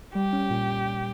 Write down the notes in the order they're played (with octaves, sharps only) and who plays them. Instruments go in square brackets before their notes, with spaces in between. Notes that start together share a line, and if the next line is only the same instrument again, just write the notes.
[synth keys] G3 [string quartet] G4
[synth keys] C#4
A#2